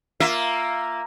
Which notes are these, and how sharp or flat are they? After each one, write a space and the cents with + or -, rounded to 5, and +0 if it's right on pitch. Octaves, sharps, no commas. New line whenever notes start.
A#3 +0 F4 -5 E5 +10